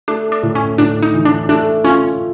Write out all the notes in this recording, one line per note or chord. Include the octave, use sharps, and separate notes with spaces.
A3 D4
D4
A2
C#4
A2 D4
D#4
E3
D4
A3 D4
C#4 F4